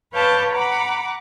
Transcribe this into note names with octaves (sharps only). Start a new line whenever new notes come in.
B4 C#5 F5 A5 D6 G6
F#5 A#5 B5 D6